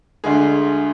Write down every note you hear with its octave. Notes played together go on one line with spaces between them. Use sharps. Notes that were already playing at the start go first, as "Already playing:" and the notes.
D2 D3 G#3 G#4